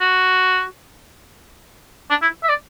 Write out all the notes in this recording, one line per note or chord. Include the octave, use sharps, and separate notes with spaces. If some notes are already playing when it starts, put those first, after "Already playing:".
F#4
D4
E4
E5
D5